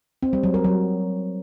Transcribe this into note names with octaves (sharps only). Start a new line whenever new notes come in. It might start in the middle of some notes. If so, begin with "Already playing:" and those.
C4
G3
F#3
A#4
F#3